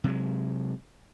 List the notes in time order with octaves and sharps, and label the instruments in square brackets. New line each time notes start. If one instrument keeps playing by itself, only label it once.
[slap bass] C3 F#3 G#3